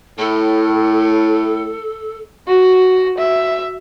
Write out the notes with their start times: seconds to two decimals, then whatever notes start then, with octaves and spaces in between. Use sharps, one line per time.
0.19 A2 A4
2.47 F#4
3.18 E5